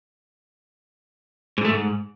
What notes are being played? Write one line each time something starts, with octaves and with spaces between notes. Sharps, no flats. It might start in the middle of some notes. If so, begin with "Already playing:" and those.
G#2
A3
G#2